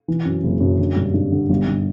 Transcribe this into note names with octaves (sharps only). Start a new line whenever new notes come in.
E3
F#2
F#1
F#2
D3
G2
G2
D3
G1
G1